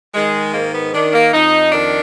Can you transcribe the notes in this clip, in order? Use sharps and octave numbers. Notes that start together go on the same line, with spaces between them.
D#3 G#3
G#2 A#3
B3
D#3 D4
A#3
F2 D#4
D#3 D4